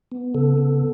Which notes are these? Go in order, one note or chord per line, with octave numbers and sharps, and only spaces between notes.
B3
C#3 A4
B3